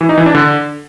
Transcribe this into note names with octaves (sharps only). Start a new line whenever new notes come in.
E3
D#4
E3
D4
D3